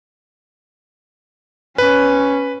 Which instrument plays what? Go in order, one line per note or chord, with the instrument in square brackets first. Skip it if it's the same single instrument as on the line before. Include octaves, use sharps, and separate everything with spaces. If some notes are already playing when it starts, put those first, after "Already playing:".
[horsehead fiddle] C#4 [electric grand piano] B4